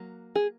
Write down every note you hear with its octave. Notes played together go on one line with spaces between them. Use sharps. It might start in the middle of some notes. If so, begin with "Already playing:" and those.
Already playing: F#3 A#3
G#4